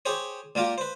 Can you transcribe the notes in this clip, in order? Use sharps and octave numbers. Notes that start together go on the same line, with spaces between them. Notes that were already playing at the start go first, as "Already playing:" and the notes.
G4 G#4 C5 C#5
A#2 A#3 F4 G4
B4 C5